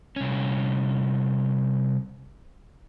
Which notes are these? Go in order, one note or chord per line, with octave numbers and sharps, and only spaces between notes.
C2 C#4